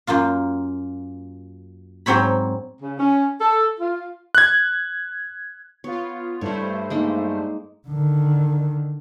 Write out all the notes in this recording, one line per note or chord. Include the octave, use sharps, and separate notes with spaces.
F#2 A#3 F4 F5
G#2 F#3 C4 C#5 B5
C#3
C#4
A4
F4
F#6 G#6
B3 F4 C#5
G2 A3 E4 C5 C#5
G#3 A#3 D#4
D3 D#3